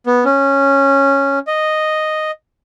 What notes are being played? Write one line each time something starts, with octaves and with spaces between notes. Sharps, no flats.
B3
C#4
D#5